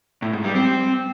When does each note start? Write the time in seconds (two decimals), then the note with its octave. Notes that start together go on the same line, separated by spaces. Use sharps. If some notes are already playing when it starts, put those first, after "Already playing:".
0.22 A2
0.33 G#2
0.44 G3
0.55 C4